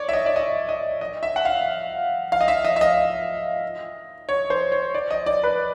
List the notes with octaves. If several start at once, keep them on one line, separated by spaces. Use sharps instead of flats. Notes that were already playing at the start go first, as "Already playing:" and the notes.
Already playing: C#5 D5
E5
D#5
D5
D#5
D#5
D#5
E5
F#5
F5
F5
D#5
E5
D#5
E5
D#5
C#5
C5
C#5
D5
D#5
D5
B4